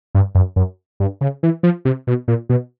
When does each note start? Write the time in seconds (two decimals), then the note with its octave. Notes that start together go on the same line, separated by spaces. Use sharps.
0.15 G2
0.35 F#2
0.56 F#2
1.00 G2
1.21 C#3
1.43 E3
1.63 F3
1.85 C3
2.07 B2
2.28 A#2
2.49 B2